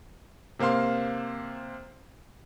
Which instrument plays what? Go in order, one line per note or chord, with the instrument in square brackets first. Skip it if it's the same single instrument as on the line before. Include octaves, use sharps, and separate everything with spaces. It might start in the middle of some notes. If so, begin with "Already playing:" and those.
[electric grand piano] C3 A#3 C5 F5 C6